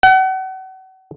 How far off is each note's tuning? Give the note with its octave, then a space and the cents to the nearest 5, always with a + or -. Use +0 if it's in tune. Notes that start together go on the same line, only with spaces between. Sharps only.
F#5 +35